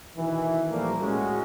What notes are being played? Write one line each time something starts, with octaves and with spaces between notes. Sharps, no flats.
B2 D#3 E3
A#2 F3 G3 A3 A#3
A2 G#3 C#4 F#4